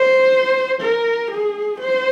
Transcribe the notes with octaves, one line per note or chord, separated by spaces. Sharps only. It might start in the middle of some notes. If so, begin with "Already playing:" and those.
Already playing: C5
A#4
G#4
C5